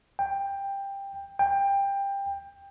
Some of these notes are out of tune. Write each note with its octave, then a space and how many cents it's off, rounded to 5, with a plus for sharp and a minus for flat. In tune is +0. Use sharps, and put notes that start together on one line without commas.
G5 +15
G5 +20